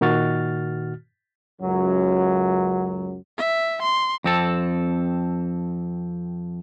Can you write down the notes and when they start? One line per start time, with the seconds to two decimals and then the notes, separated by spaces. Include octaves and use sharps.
0.01 A#2 D#3 F#4 F6 A6
1.61 C#2 F#2 F#3
3.38 E5
3.82 C6
4.24 F2 C4 A4